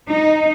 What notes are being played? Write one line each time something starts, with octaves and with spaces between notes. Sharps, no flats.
D#4